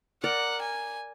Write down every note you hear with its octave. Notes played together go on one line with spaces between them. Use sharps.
A#4 D5 F#5
G#5